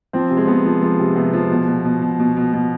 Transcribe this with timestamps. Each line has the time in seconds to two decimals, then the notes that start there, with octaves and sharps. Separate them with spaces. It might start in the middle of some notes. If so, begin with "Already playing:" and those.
0.13 F3 C4
0.30 C3
0.37 G#3
0.47 C3 B3
0.65 F3
0.82 F3 G#3
0.99 C3
1.16 C3 B3
1.33 F3
1.51 B2
1.68 B2
1.85 B2
2.02 B2
2.19 B2
2.37 B2
2.53 B2